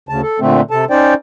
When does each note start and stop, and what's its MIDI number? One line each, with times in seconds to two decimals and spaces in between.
0.09 0.21 38
0.09 0.21 49
0.09 0.21 81
0.23 0.40 69
0.40 0.61 46
0.40 0.61 50
0.40 0.61 57
0.40 0.61 60
0.71 0.85 48
0.71 0.85 69
0.71 0.85 81
0.90 1.14 61
0.90 1.14 63
0.90 1.14 72
0.90 1.14 74
0.90 1.14 79